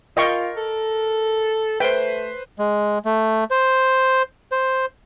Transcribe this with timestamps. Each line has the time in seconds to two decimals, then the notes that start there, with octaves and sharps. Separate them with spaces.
0.17 F4 A#4 D#5 G5 C#6
0.56 A4
1.80 A3 B4 C5 G5
2.59 G#3
3.05 A3
3.51 C5
4.52 C5